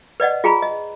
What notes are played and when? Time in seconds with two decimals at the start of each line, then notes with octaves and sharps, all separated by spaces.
0.20 B4 D5 D#5 F#5
0.44 F4 G#4 G#5 A#5 B5
0.62 D#5